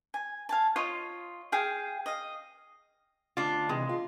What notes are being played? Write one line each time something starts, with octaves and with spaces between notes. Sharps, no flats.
G#5
F5 G#5 A5
F4 C#5 D#5 C6
G#4 F5 G5
D#5 F5
D2 D4 F4
C3 E3 G#3
F4